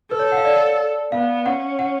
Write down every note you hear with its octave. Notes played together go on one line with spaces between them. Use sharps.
A4 B4
C#5
F#5
F5
D5
B3 F5
C#4 F#5
F#5